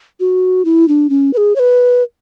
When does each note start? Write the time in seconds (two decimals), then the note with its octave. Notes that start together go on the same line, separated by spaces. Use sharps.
0.20 F#4
0.65 E4
0.88 D4
1.10 C#4
1.33 B4
1.37 G#4
1.56 C#5
1.59 B4